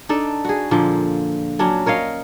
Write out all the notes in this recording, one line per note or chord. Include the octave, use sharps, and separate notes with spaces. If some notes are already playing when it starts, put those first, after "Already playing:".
D4 D#4 A4
F#4 G#4
A#2 D3 F3 A#3
F#3 C#4 D4
A#4 C#5 D#5 F5